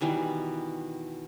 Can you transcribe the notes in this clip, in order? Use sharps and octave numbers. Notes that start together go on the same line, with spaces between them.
B2 D#3 E3 G3